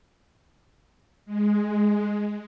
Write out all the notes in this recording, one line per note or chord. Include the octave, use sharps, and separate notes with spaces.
G#3